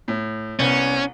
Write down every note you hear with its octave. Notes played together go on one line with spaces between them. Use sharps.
A2
C2 B3 C#4